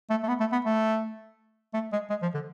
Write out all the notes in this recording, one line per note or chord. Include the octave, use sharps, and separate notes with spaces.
A3
A3
B3
A3
B3
A3
A3
G#3
G#3
F3
D3